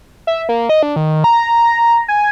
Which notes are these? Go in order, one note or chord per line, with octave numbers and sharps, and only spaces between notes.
E5
A#3
D#5
D4
D#3
A#5
G#5